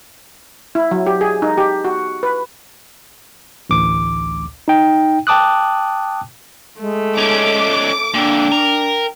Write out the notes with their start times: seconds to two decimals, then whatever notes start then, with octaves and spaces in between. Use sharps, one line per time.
0.75 E4
0.91 F#3
1.07 G4
1.21 G#4
1.42 D#4
1.58 G4
1.84 F#4
2.23 B4
3.70 A1 D2 D6
4.68 D#4 G5
5.27 G5 A5 D6 D#6 F#6
6.80 G#3 A3
7.17 C#4 D#4 D6
8.14 A#2 D3 D4 G5
8.52 A#4